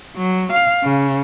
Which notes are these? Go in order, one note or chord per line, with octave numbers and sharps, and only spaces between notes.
F#3
F5
C#3